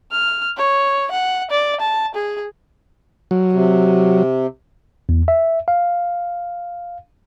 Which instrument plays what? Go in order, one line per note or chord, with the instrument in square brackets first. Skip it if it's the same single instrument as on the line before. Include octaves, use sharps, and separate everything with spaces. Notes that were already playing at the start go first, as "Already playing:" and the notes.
[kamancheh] F6
C#5
F#5
D5
A5
G#4
[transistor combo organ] F#3
[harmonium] C3
[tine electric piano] E2
E5
F5